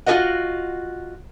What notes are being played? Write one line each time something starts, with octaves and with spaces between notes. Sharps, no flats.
F4 F#4 G#4 A#4 D#5 F#5